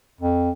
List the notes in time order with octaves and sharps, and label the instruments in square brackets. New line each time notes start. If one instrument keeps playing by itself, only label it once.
[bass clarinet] F2